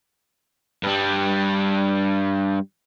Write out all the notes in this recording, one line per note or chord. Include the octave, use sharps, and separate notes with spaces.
G2 G3